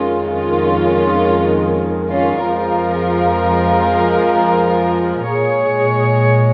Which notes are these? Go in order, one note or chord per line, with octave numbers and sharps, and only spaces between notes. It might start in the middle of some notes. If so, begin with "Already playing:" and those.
Already playing: F2 D#3 G#3 C#4 F4
C#4 F4
C#4 F4
F2 F3 G#3 F4 A#4
A#2 G#3 G#4 C#5